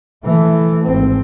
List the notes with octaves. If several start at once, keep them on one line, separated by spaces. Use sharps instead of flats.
E3 A3
G#1 C4